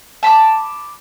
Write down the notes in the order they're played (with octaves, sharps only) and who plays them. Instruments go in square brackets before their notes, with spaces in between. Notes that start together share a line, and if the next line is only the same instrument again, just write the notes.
[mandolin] A5 B5 C6 D6